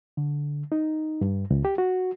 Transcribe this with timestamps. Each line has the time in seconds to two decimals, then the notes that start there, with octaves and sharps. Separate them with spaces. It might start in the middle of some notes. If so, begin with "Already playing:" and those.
0.17 D3
0.72 D#4
1.21 G2
1.51 C#2
1.65 G4
1.78 F#4